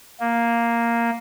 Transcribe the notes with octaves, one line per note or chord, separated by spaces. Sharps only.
A#3